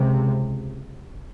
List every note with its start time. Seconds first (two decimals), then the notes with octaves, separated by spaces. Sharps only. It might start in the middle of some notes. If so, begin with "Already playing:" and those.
Already playing: C#2 C3